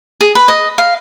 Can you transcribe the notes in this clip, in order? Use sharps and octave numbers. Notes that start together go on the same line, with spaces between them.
G#4
B4
D#5
F5